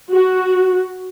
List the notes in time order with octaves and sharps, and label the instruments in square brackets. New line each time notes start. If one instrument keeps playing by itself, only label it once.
[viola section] F#4